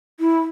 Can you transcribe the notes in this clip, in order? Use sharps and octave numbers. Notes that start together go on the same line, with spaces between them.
E4